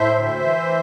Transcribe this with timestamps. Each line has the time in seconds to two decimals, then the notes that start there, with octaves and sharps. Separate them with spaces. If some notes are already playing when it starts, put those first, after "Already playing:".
Already playing: A2 C5 E5
0.15 D2
0.42 E3